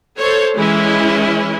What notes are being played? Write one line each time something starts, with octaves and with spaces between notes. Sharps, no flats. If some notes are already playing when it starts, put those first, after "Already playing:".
A4 C5 C#5
E3 G#3 C#4 E4